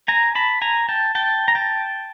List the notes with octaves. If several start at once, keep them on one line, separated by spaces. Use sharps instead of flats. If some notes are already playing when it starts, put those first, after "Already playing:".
G#5 A#5
A5 B5
G#5 A#5
G5 A5
G5 A5
A#5
G5 A5